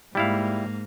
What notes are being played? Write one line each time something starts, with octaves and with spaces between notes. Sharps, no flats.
G#2 G3 A#3 E4 F5